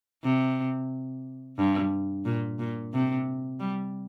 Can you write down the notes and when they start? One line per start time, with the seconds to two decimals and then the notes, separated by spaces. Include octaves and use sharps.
0.23 C3
1.57 G2
2.25 A#2
2.59 A#2
2.94 C3
3.60 G3